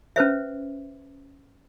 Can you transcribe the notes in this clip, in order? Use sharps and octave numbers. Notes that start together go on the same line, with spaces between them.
C#4 B4 C5 E5